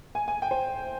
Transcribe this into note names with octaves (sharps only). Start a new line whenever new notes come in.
G#5
G#5
G5
C5